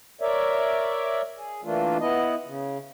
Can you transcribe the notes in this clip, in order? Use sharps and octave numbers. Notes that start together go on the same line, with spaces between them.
A#4 C#5 D5 E5
G#4
E3 A3 A#3 D4 F4
B3 E4 D#5
C#3